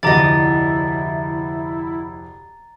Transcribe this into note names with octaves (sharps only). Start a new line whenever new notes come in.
F1 D2 E4 D5 D#5 A#5 A6